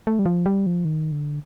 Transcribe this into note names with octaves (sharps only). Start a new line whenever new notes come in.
A3
G3
F3
G3
F3
D#3
D3